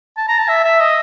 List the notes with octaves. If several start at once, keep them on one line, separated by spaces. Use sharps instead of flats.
A5
A#5
A5
E5
E5
D#5